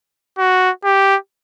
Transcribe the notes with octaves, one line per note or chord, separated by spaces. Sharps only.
F#4
G4